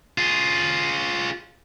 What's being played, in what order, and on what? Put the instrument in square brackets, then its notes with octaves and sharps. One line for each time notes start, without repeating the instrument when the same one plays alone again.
[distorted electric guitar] F4 G#4